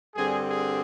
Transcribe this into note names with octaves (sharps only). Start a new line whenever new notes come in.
G2 D3 G3 C4 G#4
G#4